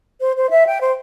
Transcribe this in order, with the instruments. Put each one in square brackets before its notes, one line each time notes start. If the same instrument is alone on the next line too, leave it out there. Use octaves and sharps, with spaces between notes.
[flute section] C5
C5
E5
G5
C5